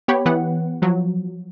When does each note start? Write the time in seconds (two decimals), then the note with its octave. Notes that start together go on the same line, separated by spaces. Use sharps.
0.08 B3 G4 C#5 G5 B5
0.26 E3 B3 B4 F#5
0.82 F3 F#3